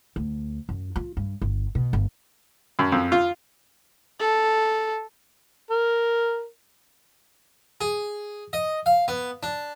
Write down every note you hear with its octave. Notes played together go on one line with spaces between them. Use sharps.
D2
F#2
F4
G2
G1
B2
G1
F#2
F2
F4
A4
A#4
G#4
D#5
F5
B3
D4